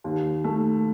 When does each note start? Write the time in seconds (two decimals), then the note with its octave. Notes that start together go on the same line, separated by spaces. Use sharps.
0.04 D#2
0.44 A3